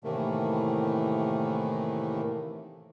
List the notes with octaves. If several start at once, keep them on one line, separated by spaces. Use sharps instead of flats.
A2 C3 D#3 E3 A3 A#3